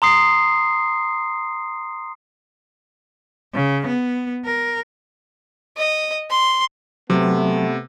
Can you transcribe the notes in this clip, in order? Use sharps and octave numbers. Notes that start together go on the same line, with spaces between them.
A#5 C6 D#6 C7
C#3
B3
A#4
D#5
C6
C3 F#3 A3 B3